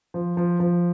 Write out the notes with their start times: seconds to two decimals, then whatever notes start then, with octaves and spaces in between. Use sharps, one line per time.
0.14 F3
0.37 F3
0.60 F3